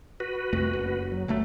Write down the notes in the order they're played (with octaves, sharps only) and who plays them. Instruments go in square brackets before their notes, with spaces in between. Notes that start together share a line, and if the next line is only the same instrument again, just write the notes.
[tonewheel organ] F#4 B4
[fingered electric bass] C2 F2 A3
F#1
[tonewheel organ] F#3
[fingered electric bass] G1 D2 A3